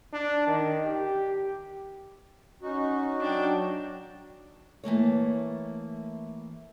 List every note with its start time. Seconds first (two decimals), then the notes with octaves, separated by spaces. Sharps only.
0.13 D4
0.47 D#3
0.86 G4
2.62 C#4 D#4 F#4
3.21 F#3 D4 G5
4.84 E3 A3 A#3 C#5